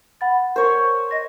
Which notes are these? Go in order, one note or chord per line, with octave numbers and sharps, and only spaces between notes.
F#5 B5 A6
A#4 C5 C#5
D#5 A#6